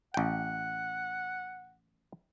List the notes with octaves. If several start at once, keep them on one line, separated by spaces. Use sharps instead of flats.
A1 F#5 G5